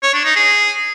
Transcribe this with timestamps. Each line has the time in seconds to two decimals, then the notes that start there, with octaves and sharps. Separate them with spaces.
0.03 C#5
0.14 D4
0.25 D#4
0.36 G#4